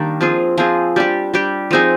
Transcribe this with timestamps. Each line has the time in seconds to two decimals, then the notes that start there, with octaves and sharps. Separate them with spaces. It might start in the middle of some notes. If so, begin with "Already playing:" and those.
Already playing: D#3 G3 A#3 D4
0.21 F3 C4 F4 G#4
0.58 F3 C4 F4 G#4
0.96 G3 D4 G4
1.34 G3 D4 G4
1.71 F3 C4 D#4 G#4